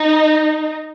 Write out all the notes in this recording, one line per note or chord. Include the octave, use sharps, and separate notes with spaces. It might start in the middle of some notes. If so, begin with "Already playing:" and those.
Already playing: D#4